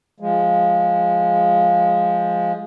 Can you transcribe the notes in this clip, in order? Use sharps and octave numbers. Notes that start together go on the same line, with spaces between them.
F3 G#3